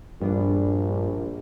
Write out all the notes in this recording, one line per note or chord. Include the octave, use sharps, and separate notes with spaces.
A#1 G2 G3 B3 D4